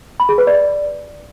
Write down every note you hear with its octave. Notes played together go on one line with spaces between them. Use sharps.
B5
G#4
B4
D5